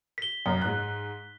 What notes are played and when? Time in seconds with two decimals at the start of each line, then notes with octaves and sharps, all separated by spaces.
0.18 B6 G7
0.46 F#2
0.62 G#2 F#6